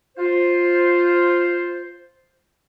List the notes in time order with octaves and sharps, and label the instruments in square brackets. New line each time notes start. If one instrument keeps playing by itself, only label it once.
[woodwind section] F4 C5